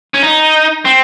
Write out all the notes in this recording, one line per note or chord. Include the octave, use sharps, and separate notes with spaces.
C#4
D#4
C4